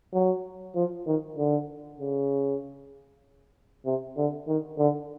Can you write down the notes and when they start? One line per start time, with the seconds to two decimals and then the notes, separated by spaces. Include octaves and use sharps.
0.13 F#3
0.75 F3
1.07 D#3
1.37 D3
2.00 C#3
3.85 C3
4.17 D3
4.48 D#3
4.79 D3